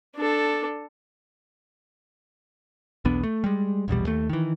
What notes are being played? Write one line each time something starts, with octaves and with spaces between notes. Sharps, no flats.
D4 A4
B1 E2 B3 D4
A3
G3 G#3
A#1 E2 B2 G3
D#2 A3
D#3 E3